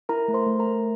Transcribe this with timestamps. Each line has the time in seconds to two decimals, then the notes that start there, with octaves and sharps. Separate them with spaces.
0.09 E4 A#4 A#5
0.28 A3
0.34 C5 C6
0.47 A3
0.60 A#4 A#5
0.66 A3